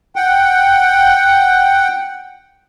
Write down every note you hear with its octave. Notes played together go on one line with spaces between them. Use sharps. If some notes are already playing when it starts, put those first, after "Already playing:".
F#5 G5